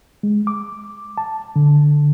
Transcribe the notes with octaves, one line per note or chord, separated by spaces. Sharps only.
G#3
D6
A5
D3